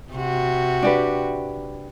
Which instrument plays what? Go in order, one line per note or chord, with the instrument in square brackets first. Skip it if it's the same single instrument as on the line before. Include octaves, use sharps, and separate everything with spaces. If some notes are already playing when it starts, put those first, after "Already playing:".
[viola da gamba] C3 F#4
[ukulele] D4 G4 B4